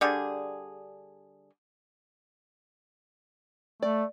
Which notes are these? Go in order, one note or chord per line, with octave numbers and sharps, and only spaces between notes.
D3 G3 G#4
A3 D5